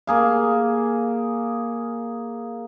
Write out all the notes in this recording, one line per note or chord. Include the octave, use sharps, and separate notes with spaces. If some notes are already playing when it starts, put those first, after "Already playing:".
A#3 G#4 F5